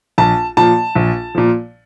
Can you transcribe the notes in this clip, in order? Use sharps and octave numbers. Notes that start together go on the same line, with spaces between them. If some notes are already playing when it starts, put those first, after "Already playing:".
A#1 A5
A#2 F3 A5
A#1
A#2 F3